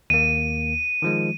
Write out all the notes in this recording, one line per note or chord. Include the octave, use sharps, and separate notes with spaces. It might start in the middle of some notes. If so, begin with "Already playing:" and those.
D#2 A#3 D#7
D#3 F3 G#3